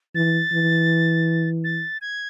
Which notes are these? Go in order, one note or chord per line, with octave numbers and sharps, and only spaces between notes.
E3 A6
E3
A6
G#6